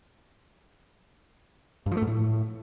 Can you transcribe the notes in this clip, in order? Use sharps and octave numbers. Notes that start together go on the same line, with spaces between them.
G2
F3
A3
G#2
A2